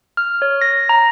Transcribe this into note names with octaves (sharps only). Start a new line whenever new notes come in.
F6
C#5
A#6
A#5